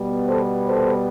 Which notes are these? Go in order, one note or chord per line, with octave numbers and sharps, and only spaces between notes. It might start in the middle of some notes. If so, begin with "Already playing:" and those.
Already playing: B2 G3 B3
A4 C5
A4 C5